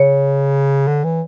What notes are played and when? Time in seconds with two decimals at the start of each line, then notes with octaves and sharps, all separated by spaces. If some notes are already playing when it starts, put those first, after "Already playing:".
Already playing: C#3 C#5
0.87 D3
1.04 E3